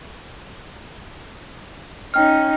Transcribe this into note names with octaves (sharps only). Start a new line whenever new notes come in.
C#4 D#4 G5 F6